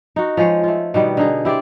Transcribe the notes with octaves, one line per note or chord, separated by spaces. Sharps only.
D#4 F#4
F3 G#3 G#4 C#5
A3 F4
B2 D#3 G3 B3
D3 D#4 G#4
E4 G4 C5 D5